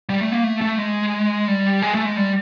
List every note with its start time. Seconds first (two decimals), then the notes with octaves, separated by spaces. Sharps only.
0.09 G3
0.21 A3
0.32 A#3
0.44 A3
0.62 A3
0.78 G#3
1.48 G3
1.82 G#3
1.95 A3
2.05 G#3
2.17 G3